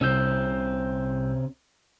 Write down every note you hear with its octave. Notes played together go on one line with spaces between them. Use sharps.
C2 C3 C4 C#4 E6 G6